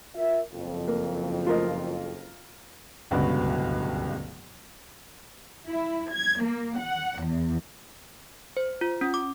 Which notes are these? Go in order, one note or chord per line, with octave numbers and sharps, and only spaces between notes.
F4 A#4 E5
F#1 F2
A#3
F4 A#4 D#5
D1 C#2 G2 B2 F#4 B4
E4
G#6
A#3
F#5
E2
C5
F4
C#4
D6